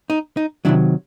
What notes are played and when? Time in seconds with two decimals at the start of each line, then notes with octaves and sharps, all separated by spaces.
0.10 D#4
0.37 D#4
0.65 C3 D#3 F#3 D4 E4